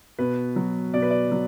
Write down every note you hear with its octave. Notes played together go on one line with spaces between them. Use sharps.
B2 B4
F#3
B2 D5
B4
D5
F#3